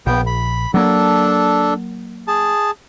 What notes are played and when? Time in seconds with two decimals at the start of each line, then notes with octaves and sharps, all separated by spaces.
0.06 A#1 B3 G5
0.27 B5
0.74 F#3 A#3 D4 A4
2.28 G#4 A5